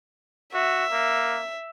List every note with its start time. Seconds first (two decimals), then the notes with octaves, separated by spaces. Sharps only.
0.54 F#4 E5
0.92 A#3